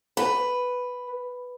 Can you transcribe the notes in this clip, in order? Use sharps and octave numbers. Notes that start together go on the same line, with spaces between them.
B4